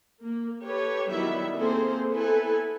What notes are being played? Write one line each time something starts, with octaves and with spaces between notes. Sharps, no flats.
A#3
G4 A4 B4 C#5
D#3 F#3 G3 B3 E4 E5
A#3 C4 G#4 A4 C5
B3 E4 A4 B4 G#5